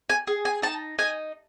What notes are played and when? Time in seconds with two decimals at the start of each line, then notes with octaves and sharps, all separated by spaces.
0.10 G#5
0.27 G#4
0.45 G#5
0.62 D#4 A5
0.98 D#4 G#5